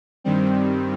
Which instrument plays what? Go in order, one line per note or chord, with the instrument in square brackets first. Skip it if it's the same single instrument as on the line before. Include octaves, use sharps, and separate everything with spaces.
[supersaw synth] G2 D#3 G3 C4